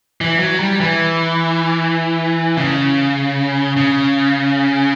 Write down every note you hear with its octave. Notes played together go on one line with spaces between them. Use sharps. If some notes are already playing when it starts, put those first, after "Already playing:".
E3
F#3
G3
E3
C#3
C#3